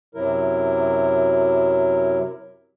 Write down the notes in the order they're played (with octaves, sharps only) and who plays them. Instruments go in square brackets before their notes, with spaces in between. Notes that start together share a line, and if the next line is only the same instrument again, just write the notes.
[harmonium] F#2 C3 F#3 E4 A#4